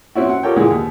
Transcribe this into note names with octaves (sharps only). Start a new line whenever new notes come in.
E3 C4 C#4 E4 F#4
F#5
F4 G4 A4 A#4 C#5 G5
A#2 D3 E3 G#3
D#2